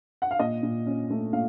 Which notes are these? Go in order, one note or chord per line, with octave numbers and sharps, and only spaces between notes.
F#5
F5
A#2 D#5
A#2
C#4
A3
A#2 F5